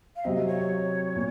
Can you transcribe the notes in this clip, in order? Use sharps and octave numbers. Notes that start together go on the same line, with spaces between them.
F5
C3 F#3 C4 D#5
C#5
A#2